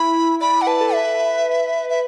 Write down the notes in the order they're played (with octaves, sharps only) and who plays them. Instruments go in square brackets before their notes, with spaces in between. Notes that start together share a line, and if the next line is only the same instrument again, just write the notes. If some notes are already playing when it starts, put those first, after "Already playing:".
Already playing: [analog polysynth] E4 [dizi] B5
[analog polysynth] D5 [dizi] B5
[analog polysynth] D5
[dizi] F#5
[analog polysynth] B4 [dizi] A5
[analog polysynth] A4
[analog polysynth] B4 [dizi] E5
[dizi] E5